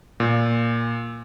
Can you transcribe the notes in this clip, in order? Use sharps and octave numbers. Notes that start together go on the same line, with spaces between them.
A#2